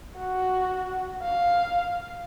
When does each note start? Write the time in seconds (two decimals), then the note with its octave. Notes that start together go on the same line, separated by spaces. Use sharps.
0.17 F#4
1.22 F5